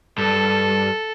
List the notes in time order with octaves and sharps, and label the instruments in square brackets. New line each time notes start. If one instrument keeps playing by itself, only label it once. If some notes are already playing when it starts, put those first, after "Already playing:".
[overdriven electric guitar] G2 [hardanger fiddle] A4